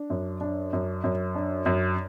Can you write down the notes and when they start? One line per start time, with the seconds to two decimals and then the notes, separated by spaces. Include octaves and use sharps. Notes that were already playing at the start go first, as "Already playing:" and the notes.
Already playing: D4
0.10 F#2
0.41 D4
0.73 F#2
1.04 F#2
1.35 D4
1.66 F#2